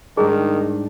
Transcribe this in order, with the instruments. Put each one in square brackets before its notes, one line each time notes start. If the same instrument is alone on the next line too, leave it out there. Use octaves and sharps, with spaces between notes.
[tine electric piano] G#2 G3 D4 [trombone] D#3 [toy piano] G#4